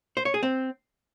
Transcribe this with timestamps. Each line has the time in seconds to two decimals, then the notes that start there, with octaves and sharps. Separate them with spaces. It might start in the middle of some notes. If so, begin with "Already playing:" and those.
0.17 C5
0.25 C#5
0.34 G#4
0.43 C4